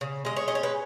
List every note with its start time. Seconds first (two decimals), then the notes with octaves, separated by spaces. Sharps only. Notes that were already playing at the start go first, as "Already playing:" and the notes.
0.01 C#3
0.25 G#3 D#5
0.36 C#5
0.48 C#4 D#5
0.55 C#5
0.63 B4